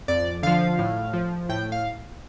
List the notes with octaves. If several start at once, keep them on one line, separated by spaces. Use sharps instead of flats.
F2 D5
D3 F3 F5
A2
F3
A2 G5
F5